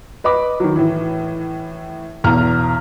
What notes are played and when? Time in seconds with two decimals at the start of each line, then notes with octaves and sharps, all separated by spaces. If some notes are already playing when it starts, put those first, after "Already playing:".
0.24 B4 D#5 B5 D6
0.60 D#3 F#3
0.76 A2 E3
2.24 B1 E2 A#5 F6